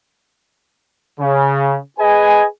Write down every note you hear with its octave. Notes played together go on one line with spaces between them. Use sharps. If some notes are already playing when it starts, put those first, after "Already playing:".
C#3
G#4 B4 D#5 G#5